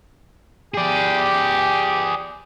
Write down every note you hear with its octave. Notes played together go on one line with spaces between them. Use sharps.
G4 G#4 D5